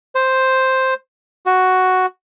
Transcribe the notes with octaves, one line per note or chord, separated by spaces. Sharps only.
C5
F#4